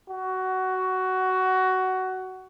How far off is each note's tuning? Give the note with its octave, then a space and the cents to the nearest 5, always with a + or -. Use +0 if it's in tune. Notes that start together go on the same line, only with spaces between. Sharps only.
F#4 +15